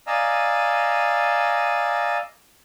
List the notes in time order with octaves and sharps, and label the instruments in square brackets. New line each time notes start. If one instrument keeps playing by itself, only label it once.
[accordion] D5 D#5 F5 G#5 A#5 E6